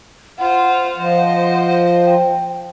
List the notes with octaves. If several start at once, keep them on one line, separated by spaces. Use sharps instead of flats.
F4 C5 F#5
F3 C5 D#5
G5